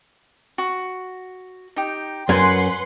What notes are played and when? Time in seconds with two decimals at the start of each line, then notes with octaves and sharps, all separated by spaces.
0.58 F#4
1.76 D#4 G4
2.29 F#2 B4 F#5 G#5 C6